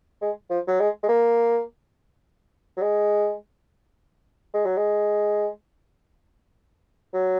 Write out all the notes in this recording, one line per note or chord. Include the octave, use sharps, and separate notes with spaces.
G#3
F3
F#3
G#3
G#3
A#3
F#3
G#3
G#3
F#3
G#3
F#3